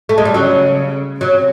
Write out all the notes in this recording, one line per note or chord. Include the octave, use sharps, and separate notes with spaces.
A3
G#3
G3
C#3 F#3
C3 F#3